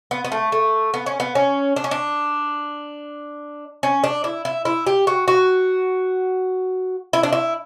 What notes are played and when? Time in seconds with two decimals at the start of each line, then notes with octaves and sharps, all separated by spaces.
0.11 B3
0.24 B3
0.32 A3
0.52 A3
0.94 B3
1.06 C#4
1.20 B3
1.35 C#4
1.76 D4
1.84 C#4
1.91 D4
3.83 C#4
4.04 D4
4.24 E4
4.45 E4
4.65 E4
4.87 G4
5.07 F#4
5.28 F#4
7.13 E4
7.23 D4
7.32 E4